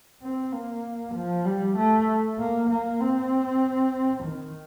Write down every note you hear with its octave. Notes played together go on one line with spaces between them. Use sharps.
C4
A#3
F3
G3
A3
A#3
A#3
C4
D#3